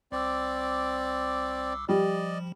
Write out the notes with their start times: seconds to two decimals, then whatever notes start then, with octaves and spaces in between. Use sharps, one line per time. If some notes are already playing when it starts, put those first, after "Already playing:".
0.12 C2 C4 D5 D6 E6
1.89 F3 G3 D5 D#5